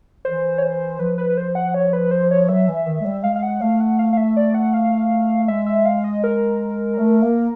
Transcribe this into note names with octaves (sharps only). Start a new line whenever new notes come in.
E3 C5
C#5
C5
F3 B4
B4
C5
F#5
C#5
B4
C5
C#5
F#3 E5
E3
D#3
G#3
G3
G#3 F5
F5
F#5
A3 F5
F#5
F5
F5
E5
D5
F#5
F5
G#3 E5
E5
F5
D#5
A#4
A3
A#3